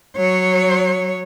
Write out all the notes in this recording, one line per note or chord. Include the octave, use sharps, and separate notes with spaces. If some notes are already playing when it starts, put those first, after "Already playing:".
F#3 C#5